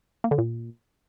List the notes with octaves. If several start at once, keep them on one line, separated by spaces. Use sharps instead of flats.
A#3
D3
A#2